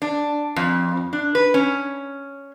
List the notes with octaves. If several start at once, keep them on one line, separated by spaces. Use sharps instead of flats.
D4
F2
D4
B4
C#4